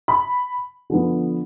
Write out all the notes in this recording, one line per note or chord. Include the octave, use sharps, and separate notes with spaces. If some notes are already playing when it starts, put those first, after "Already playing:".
B5
D3 F3 B3